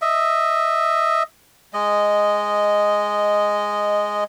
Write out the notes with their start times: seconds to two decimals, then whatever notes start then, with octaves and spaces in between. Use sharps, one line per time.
0.02 D#5 E5
1.73 G#3 D#5